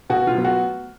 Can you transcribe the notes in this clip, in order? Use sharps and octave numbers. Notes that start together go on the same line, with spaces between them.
B2 F#4
F4
F#3 B3
F#4